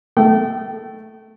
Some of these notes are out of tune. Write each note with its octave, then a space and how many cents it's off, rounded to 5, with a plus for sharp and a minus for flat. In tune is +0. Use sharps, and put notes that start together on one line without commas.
A3 +0 G5 -35